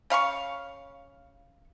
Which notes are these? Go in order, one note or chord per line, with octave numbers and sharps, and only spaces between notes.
C#3 F5 C6 C#6